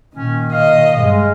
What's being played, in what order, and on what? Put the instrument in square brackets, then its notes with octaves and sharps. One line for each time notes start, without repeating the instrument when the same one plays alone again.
[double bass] A#2 D#3 [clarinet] C#4
[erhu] D#5 [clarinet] F5
[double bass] G2 G#3